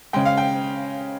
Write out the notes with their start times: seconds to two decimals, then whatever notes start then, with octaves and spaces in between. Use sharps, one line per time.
0.13 C#3 G#3 G5
0.25 F5
0.38 G5